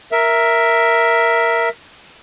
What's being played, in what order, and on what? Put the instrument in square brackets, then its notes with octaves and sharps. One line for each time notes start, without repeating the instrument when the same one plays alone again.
[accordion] A#4 E5